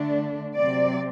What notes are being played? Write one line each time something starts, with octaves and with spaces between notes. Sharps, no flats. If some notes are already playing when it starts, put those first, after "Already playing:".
Already playing: D3 A3 D4
C3 F#3 C4 D5